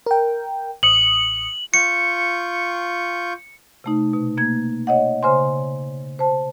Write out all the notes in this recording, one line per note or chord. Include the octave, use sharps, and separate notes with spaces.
A#4 G5
A1 D#6 C#7 F#7
F4 C#6 G6 C#7
C3 A3 D#4
B2
A#3 G#6
C#5 D#5 F#5
C#3 C5 G#5 C6
C5 A5